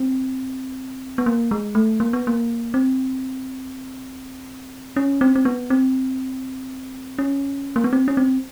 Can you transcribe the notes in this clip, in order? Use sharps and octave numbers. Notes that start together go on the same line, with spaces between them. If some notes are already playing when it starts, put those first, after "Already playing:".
Already playing: C4
B3
A#3
G#3
A3
A#3
B3
A#3
C4
C#4
C4
C4
B3
C4
C#4
A#3
B3
C4
C#4
C4